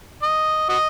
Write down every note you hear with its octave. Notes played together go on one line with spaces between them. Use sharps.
D#5
F#4 D#5